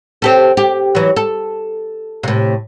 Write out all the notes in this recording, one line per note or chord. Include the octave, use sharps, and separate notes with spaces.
C4 G4 A4
G4
E3 F#3
A4
A2 C3